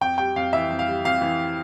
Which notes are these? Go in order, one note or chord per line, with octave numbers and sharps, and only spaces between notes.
F2 G5
G3 G5
F2 F5
E3 E5
F2
F5
G3
F2 F5
E3